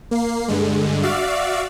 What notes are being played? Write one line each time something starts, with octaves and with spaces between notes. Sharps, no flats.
A#3 C7
G2 D3 G#3
F#4 D5 E5 F5